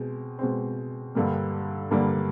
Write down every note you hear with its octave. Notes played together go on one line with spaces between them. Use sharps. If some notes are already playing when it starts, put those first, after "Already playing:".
Already playing: B2 G#3 C4
B2 G#3 C4
G2 D3 G3 A#3
G2 D3 G3 A#3